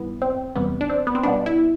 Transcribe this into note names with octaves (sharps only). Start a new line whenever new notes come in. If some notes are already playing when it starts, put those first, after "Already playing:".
Already playing: G2 E3 B3
C4
E2 C3 G3 B3
D4
C4
B3
C4
B2 G3 B3 D4
E4